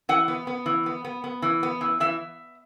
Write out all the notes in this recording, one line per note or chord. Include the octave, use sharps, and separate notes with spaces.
E3 F#5
B3
B3
E3
B3
B3
B3
E3
B3
E3
E3 E5